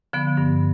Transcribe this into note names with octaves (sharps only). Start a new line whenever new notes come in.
D3 F3 B3
G2